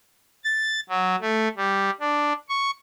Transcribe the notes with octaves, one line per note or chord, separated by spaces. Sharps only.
A6
F#3
A3
G3
D4
C#6